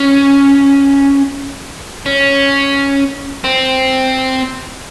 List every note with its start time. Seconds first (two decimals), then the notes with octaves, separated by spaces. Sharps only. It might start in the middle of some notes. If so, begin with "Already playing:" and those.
Already playing: C#4
2.06 C#4
3.44 C4